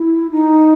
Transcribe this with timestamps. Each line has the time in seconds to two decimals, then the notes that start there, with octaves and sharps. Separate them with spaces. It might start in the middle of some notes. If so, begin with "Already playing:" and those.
Already playing: E4
0.31 D#4